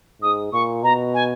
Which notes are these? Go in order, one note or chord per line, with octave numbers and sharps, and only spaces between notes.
G#2 D#6
A#2 C#6
B2 A#5
G#5